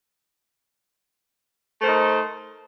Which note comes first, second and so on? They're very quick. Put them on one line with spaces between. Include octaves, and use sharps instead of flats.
A3 C5 A#4 D#4